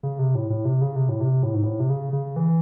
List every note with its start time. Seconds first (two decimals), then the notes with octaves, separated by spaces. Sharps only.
0.03 C#3
0.19 C3
0.35 A2
0.50 A2
0.65 C3
0.81 C#3
0.96 C3
1.09 A2
1.21 C3
1.43 A2
1.54 G#2
1.63 A2
1.80 C3
1.90 C#3
2.13 C#3
2.36 E3